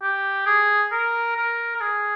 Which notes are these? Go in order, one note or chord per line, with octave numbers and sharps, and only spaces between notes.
G4
G#4
A#4
A#4
A#4
G#4